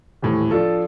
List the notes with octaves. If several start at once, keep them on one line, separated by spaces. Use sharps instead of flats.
D#1 A2 E3
F3 D4 F4 A4